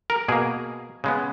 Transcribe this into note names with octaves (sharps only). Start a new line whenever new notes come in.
A#4
B2 A#3 G#4
C#3 G#3 B3